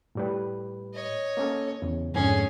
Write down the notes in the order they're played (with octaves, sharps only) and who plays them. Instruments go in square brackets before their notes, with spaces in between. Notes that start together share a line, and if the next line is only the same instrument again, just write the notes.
[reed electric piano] A2 G3 B4
[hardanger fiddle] C#5 D#5
[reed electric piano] A#3 C#4 A4
E2 C#3
[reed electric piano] F2 G#2 D3 [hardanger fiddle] C#4 G#4